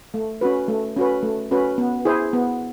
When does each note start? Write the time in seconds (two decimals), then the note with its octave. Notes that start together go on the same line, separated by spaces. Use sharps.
0.14 A3
0.41 C#4 F#4 B4
0.68 A3
0.97 C#4 F#4 B4
1.23 A3
1.51 C#4 F#4 B4
1.78 B3
2.05 E4 G#4 C5
2.33 B3